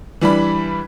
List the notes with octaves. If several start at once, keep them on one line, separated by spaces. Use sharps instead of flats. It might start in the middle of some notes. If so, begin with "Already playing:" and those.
E3 G3 D4 B5